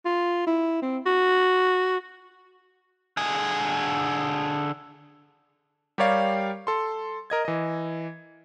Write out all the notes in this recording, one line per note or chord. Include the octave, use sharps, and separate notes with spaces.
F4
E4
C4
F#4
D3 G#4
G3 G4 A#4 C#5 D5 F5
A4 C6
A#4 D#5 G#6
E3 D#5